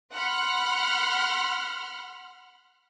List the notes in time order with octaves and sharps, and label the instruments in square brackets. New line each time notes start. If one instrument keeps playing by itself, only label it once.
[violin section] F#5 B5 C6 F6 F#6